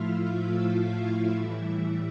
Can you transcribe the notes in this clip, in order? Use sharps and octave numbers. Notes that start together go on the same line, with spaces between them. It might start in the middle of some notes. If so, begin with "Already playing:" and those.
Already playing: A2 F3 A3 E4 F4 E5 F5
E4 E5
E4 E5
A2 E3 G3